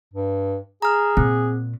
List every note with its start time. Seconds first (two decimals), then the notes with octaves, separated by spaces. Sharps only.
0.14 G2
0.82 G#4 A#5 F6
1.17 A#2 C4